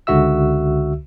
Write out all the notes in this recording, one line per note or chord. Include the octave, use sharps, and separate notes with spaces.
C#2 D3 F#4 E5 E6